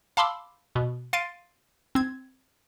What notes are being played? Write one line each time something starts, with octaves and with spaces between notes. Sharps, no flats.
F5 A5 B5 C6 D6 E6
B2
F5 C6 A6 C7 D7 D#7
C4 G#6